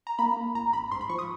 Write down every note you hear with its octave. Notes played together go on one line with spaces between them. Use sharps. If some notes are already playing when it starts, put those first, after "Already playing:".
A#5
A#3 B5
A#3
A1 A#5
A1 B5
G#2 C6
B5
F3 C#6
D#6